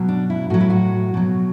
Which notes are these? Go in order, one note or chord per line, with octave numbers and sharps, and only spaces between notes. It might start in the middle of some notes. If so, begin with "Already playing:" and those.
Already playing: B2 F#3
D4
E4
A2 F#3 F#4
E4
F#4
B2 F#3